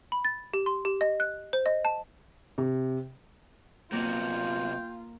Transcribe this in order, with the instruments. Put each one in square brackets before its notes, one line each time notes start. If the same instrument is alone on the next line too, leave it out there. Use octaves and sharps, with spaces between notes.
[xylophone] B5
A6
G4
C6
G4
D#5
F#6
C5
D#5
A5
[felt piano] C3
[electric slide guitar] C3 F#3 B3 [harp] A#3 [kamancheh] F4 [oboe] G5